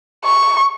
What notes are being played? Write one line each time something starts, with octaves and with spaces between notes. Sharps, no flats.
C#6